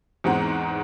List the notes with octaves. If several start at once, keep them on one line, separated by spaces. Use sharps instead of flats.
E2 G#2 G#3 C4 F#5 A#5